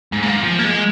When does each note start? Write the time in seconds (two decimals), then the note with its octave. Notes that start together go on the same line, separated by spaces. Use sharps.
0.12 G#2
0.23 A#2
0.43 F3
0.59 A#3
0.64 G#3